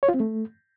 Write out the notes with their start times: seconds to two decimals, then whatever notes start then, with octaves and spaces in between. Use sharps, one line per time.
0.03 C#5
0.08 F4
0.14 C4
0.20 A3